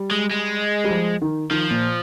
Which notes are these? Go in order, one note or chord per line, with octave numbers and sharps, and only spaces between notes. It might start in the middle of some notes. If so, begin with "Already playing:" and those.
Already playing: G3
G#3
G#3
G3
F3
D#3
D#3 F3
A#2